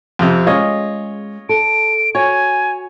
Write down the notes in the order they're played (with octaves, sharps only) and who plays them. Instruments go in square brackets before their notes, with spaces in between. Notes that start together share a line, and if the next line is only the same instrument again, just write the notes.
[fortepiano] F2 C3
[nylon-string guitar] G#3 C#4 G#4 [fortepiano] F4 C#5 D#5
[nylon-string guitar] A4 [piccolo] D7
[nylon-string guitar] F#4 [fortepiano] C#5 [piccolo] G#5